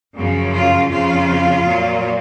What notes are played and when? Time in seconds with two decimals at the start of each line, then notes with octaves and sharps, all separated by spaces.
0.15 F#2 C#3 F3
0.53 F4
0.90 F2 C#3 F3 F4
1.65 A#2 F#3